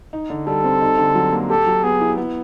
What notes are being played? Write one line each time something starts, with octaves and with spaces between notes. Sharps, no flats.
D#4
D3
G3 A4
C4
D#4
D3
F#3
A#3
G4 A4
F#3
B3 G#4
E4
B3